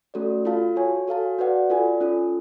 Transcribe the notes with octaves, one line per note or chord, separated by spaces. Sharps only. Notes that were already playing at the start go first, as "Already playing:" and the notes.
A3 C#4 F#4 A4 D5
F4 A4 F5 A5
F#4 C#5 G#5
F#4 A4 F5 A5
F#4 B4 D5 F#5
F4 A4 D5 G#5
C#4 F4 A4